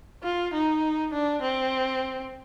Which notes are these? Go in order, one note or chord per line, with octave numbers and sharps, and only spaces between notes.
F4
D#4
D4
C4